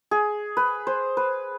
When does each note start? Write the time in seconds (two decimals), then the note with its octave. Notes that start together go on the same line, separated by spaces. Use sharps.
0.11 G#4
0.57 B4
0.87 C5
1.17 B4